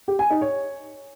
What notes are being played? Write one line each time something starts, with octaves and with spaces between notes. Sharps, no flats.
G4
G#5
D#4
C#5